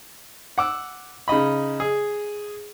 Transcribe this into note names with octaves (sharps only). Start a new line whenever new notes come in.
F#5 D6 E6
C#3 D#4 D#5 B5
G#4